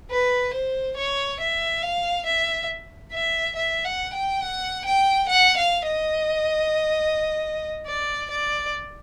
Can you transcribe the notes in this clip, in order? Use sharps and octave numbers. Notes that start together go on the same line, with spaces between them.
B4
C5
C#5
E5
F5
E5
E5
E5
F#5
G5
F#5
G5
F#5
F5
D#5
D5
D5